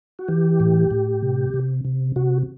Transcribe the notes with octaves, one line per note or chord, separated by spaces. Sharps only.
F#4
E3 G4
A2
A2
C3
C3
C3
C3 F#4